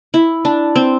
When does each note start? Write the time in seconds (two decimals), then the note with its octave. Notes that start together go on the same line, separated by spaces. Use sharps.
0.14 E4
0.45 D4
0.76 C4